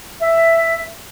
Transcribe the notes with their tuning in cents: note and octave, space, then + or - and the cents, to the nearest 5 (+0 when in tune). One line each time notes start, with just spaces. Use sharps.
E5 +5